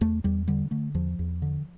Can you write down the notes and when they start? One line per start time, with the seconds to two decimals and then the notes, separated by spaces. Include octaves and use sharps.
0.01 E2 A3
0.24 E2 G3
0.48 D3 G3
0.71 D3 A3
0.94 E2 F3
1.19 E2
1.42 D3